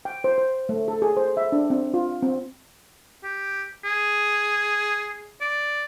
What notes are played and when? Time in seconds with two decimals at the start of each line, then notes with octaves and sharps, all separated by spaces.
0.05 G5
0.24 C5
0.38 C5
0.69 A3
0.88 A4
1.02 G#4
1.17 C5
1.37 E5
1.52 D4
1.70 C4
1.94 F4
2.23 C4
3.24 G4
3.84 G#4
5.41 D5